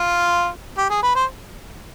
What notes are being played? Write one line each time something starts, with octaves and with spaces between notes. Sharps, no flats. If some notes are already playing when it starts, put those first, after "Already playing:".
Already playing: F4
G4
G#4
B4
C5